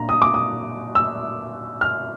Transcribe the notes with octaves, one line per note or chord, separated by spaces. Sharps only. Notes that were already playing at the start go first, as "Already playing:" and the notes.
Already playing: A#2 D4 A#5
D#6
D6
D#6
E6
F6